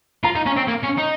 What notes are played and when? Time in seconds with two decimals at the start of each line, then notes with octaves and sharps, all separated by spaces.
0.24 F4 A#5
0.36 D#4
0.46 C#4
0.57 C4
0.68 A#3
0.83 C#4
0.98 D#4